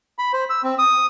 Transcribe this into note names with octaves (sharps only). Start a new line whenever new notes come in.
B5
C5
E6
C4
D#6